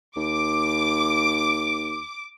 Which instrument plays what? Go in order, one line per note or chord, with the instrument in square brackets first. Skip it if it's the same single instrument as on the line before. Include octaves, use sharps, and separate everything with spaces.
[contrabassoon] D#2 [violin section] D6